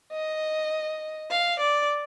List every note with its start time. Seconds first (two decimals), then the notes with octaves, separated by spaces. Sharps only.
0.12 D#5
1.31 F5
1.59 D5